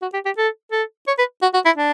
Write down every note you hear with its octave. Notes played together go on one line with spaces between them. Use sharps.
F#4
G4
G4
A4
A4
C#5
B4
F#4
F#4
E4
D4